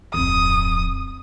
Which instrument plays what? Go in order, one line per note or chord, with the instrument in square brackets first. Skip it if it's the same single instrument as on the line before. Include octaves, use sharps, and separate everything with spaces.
[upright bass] D1 F2 [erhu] D#6